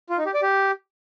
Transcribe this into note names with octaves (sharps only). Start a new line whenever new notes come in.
F4
D#4
G4
D5
G4